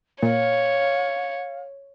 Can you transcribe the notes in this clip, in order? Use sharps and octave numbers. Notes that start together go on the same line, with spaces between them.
A#2 C#5 F5